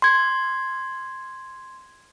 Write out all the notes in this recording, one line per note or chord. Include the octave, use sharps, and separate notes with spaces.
C6 G#6